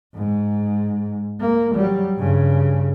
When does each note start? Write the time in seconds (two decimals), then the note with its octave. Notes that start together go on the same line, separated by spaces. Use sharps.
0.15 G#2
1.40 A#3
1.73 F#3 G3
2.17 G2 C#3